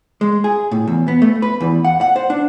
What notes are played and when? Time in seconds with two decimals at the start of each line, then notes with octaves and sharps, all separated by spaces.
0.21 G#3
0.44 G#4
0.71 A2
0.87 E2
1.08 B3
1.22 A3
1.42 B4
1.61 E2
1.85 F#5
2.01 F#5
2.16 C5
2.30 D4